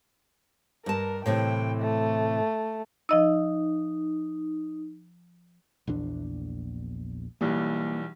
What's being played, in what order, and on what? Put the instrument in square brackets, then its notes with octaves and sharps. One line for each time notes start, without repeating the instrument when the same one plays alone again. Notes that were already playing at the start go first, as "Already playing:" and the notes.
[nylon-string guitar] G2 A5 [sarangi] A#4
[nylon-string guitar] A2 C3 E3 [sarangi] G5
[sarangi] A3
[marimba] F3 D#5 E6 [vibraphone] D#4
[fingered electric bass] A#1 E2 D4
[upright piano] B1 E3 G3 [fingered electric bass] A#3